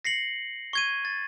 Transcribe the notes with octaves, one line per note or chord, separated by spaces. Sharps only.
A#6 C7 C#7 F#7
C#6 G#6 D#7
A6